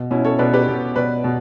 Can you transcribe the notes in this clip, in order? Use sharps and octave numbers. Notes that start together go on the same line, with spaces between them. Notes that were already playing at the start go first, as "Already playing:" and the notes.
Already playing: B2
B2 C#4 E4
A4 C#5
B2 B4 D5
G4 B4
B2
B2 B4 D5
B2